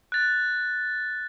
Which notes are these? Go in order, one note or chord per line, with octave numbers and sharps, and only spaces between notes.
F#6 A6